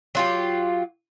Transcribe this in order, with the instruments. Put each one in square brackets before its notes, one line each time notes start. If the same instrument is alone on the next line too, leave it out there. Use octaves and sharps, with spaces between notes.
[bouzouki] F#3 F4 G4